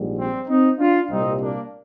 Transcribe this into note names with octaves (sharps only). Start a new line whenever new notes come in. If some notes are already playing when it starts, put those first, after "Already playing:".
Already playing: A#1 G#2 G3
C4
C4 D#4
D4 F4
C2 A#2 G3 C4 D#4
A#3 D4